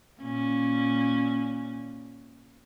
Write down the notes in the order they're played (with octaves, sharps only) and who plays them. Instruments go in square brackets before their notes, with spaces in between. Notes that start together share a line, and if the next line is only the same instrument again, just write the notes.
[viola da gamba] A#2 C#4